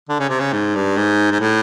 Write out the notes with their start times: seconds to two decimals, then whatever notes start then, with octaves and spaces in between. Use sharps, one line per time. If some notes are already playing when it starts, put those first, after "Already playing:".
0.09 D3
0.19 C#3
0.29 C3
0.40 C#3
0.53 G#2
0.75 G2
0.97 G#2
1.31 G#2
1.40 A2